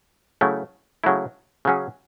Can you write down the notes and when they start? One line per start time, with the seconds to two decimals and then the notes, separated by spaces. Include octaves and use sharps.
0.41 C#3 F#3 A3 E4
1.04 C#3 F#3 A3 E4
1.65 C#3 F#3 C#4 G#4